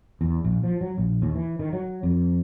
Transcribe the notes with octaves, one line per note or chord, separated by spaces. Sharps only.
E2
A#1
F3
F#3
A#1
D#2
E3
D#3
F#3
F2